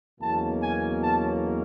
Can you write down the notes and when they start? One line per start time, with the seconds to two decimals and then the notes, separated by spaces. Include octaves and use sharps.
0.20 E2 B2 F#3 A#3 C#4 A5
0.61 G#5
1.01 A5